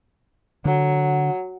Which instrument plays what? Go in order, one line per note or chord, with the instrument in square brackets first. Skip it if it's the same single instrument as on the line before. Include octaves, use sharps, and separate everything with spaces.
[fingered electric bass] D3 [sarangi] F#3